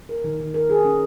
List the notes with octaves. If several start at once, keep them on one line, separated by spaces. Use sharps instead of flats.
A#4
D#3
D#3
A#4
G#4
C#4